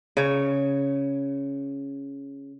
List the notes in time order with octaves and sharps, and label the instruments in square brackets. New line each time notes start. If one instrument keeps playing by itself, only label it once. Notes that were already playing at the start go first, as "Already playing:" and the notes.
[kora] C#3 C#5